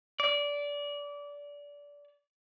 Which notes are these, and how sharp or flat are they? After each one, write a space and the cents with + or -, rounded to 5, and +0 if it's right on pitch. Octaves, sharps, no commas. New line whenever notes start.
D5 -20